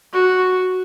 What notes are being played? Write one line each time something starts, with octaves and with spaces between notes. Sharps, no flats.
F#4